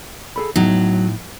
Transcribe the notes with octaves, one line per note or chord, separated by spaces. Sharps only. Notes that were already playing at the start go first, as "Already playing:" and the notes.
G#4 A4 B5
A2 F#3 B3 D#4